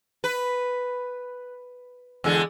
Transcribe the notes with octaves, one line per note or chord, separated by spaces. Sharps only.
B4
E2 D3 G#3